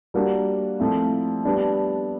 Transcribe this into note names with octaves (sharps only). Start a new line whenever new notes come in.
G3 A#3 D4 F#4 A#4
F3 A3 C4 E4
G3 B3 D4